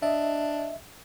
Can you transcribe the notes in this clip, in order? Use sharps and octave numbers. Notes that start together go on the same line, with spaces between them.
D4 D#5 E5